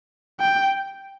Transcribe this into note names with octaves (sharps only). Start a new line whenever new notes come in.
G5